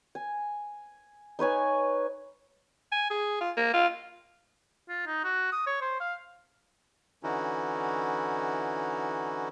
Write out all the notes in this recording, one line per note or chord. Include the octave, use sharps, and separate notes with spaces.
G#5
D#4 B4 C#5 G#5
G#5
G#4
F4
A#3
F4
F4
D#4
F#4
D#6
C#5
C5
F5
D3 E3 C#4 D#4 E4 F#4